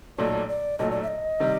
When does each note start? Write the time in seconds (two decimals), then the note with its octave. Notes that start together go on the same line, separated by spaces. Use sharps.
0.18 B1 A#2 F#3 A3 D5
0.49 D5
0.79 B1 A#2 F#3 A3 D#5
0.91 D5
1.03 E5
1.08 D#5
1.40 C3 D#3 G3